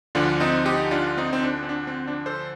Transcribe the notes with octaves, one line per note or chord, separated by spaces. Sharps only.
D2 D3 F3 D4 F4
C4 D#4
D#4 G4
D4 F4
C4 D#4
C4
D4
C4
D4
C4
D4
A4 C5